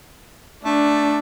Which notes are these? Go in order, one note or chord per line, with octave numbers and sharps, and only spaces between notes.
A3 D4